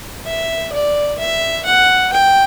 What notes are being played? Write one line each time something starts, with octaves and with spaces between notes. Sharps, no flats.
E5
D5
E5
F#5
G5